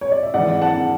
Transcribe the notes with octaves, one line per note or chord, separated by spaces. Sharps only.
C#5
D5
E5
G#2 E3 D5 F#5
F#5 A5